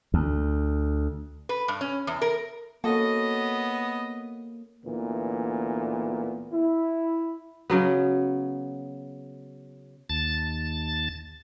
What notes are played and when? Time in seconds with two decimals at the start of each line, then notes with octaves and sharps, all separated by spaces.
0.14 D2
1.49 B4
1.68 G2
1.81 C#4
2.07 E2
2.22 A#4
2.84 A#3 B3 C#4 F#4 A4 D#5
4.85 D2 A#2 E3 B3
6.53 E4
7.70 C#3 F#3 B3
10.10 D#2 A5 A6